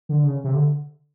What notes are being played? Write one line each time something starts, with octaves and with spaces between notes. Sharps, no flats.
D3
C#3
C3
D3